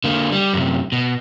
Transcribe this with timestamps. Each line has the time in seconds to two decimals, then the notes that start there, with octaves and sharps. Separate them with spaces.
0.04 D3 A#3
0.32 G3
0.53 F#2 C3
0.92 B2